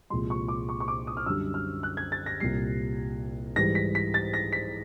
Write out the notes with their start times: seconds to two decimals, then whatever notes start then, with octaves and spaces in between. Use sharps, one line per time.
0.10 C2 A#2 F3 G#3 C6
0.30 C#6
0.48 D6
0.69 C#6
0.80 C#6
0.88 D6
1.07 D#6
1.17 F6
1.26 F#2 D3 G3 E6
1.54 F6
1.83 F#6
1.97 G#6
2.12 A6
2.26 A#6
2.40 C2 A#2 G3 C7
3.56 G#2 E3 G3 A#6
3.75 B6
3.95 B6
4.14 A6
4.34 A#6
4.52 B6